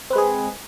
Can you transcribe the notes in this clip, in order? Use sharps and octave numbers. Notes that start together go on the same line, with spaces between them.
G#3 C4 G#4 B4